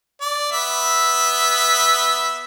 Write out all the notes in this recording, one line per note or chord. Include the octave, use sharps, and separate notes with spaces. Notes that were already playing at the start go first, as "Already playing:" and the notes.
D5
B3 E5